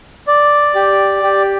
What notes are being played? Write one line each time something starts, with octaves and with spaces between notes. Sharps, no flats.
D5
G4
G4